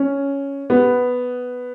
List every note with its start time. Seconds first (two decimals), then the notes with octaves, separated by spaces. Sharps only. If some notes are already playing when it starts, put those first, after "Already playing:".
Already playing: C#4
0.70 B3